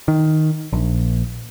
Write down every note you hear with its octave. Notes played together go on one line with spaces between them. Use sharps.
D#3
A#1